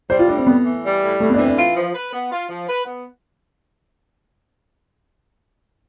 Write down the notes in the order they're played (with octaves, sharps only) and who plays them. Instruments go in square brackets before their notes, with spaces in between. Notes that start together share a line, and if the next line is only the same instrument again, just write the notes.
[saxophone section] G3 [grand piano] C5
[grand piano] F4
[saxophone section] A2 [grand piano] D4
[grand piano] C4
[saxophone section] A2 [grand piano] B3
[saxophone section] E3
G3
A2
[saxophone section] A2 [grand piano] A3
[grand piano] B3
D4
[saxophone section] E3 [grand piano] C4
[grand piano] D4
[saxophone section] F4
F3
B4
B3
F4
F3
B4
B3